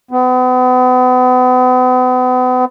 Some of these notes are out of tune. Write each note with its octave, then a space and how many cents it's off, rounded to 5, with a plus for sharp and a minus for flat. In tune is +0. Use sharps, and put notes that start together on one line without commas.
B3 +40